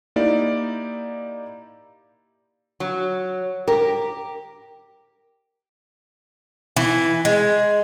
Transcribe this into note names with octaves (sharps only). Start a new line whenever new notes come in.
A#3 D#4 E4 G4 D5
F#3
G4 A#4
E3
G#3